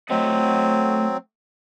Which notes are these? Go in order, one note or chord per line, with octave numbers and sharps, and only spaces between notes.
F#3 A3 C4 D#5 F#5